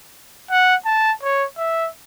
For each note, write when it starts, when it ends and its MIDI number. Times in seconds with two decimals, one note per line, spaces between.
0.51 0.76 78
0.86 1.12 81
1.23 1.45 73
1.58 1.89 76